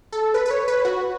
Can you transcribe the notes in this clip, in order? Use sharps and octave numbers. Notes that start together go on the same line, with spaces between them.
A4
B4
B4
C#5
B4
F#4